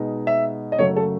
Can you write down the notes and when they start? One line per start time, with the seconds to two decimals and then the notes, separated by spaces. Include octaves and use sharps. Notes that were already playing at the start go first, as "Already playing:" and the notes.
Already playing: B2 G#3 D#4
0.27 E5
0.72 D#5
0.79 F#2 C#3 F#3 A3 C#5
0.96 A4